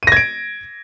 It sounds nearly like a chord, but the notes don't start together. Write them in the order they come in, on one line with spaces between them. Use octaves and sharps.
D#7 A#6 G#6 D7